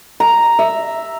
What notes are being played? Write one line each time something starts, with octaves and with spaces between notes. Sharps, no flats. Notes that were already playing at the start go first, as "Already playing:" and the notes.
A#5
E5